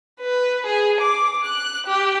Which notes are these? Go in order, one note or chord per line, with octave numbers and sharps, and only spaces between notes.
B4
G#4
D6
F#6
G4